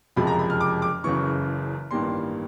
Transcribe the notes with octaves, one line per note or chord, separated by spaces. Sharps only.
F#1 F2 C3 F3 G#3 B5
A#5
B5
F6
D6
D6
F#1 F#2 C#3 E3 C#6
A1 G2 D#3 G3 A#3 C6